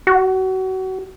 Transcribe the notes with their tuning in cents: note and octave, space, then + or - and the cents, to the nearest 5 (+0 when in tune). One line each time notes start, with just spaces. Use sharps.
F#4 +30